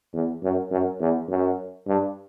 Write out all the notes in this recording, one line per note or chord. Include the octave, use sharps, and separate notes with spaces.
E2
F#2
F#2
E2
F#2
G2